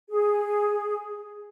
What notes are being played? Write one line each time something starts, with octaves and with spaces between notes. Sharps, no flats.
G#4